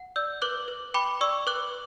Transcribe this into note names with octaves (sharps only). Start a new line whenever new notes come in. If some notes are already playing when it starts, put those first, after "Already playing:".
Already playing: F#5
D5 E6 G6
B4 D6 F#6
B4
G5 B5 D6
D5 C#6 E6
B4 D6 F#6